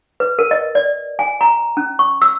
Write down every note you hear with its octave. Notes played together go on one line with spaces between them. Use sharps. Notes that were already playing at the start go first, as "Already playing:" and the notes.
B4
A#4
D#5
D5
G#5
A#5
C#4
C#6
E6